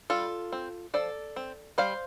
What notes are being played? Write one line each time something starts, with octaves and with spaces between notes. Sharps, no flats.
G3 F4 A4
C4
F3 A4 D5
C4
G3 C5 F5